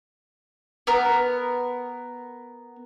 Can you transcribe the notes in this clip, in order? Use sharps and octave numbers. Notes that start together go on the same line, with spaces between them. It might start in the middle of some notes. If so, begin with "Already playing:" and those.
B3 A#4